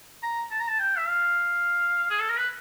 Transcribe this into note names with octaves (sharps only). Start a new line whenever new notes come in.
A#5
A5
A#5
A5
G5
E5
F5
G#4
A4
A#4
B4